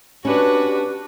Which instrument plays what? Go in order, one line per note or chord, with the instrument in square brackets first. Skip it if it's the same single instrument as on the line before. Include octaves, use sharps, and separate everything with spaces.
[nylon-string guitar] C#4 [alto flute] D4 [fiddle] F#4 B4 [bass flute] G4